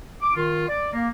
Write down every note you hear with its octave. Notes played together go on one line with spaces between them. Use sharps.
D6
D#3 F4
D5
A#3